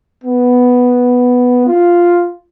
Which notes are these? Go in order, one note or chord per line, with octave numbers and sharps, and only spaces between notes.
B3
F4